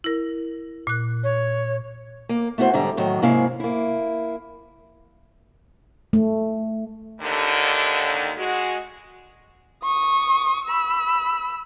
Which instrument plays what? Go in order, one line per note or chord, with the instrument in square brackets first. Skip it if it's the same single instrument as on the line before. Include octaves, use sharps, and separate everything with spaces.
[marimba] E4 A#4
A#2 F#6
[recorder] C#5
[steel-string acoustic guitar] A#3
A3 B3 E4 F#4 C5
G#2 D3 G3 E5 A#5
A2 D#3 F#3
G#2 C3 A#3 C#4 E4 F5
A#3 E4
[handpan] A3
[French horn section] D#2 D3
G#3 F#4
[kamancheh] C#6 D#6
B5 E6